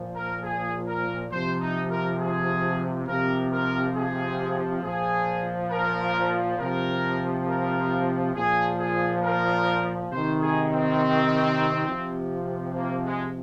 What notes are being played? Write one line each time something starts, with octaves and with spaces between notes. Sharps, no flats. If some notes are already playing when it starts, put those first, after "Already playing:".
Already playing: A#2 F3
A#4
G#4
A#4
C3 F3 C5
D#4
A#4
G#4
C3 F3 A#4
A#4
G#4
A#2 F3 G#4
A#4
C3 F3 A#4
A#4
A#2 F3 G#4
G#4
A#4
C3 D#3 C5
G#4
C4
C3 F3
A#3
G#3